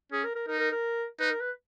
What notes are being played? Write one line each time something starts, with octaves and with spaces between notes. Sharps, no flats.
C#4 G#4
A#4
A#4
D#4 A#4
A#4
A#4
D#4 B4
A#4
B4